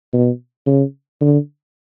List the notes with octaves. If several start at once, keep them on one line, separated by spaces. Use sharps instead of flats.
B2
C#3
D3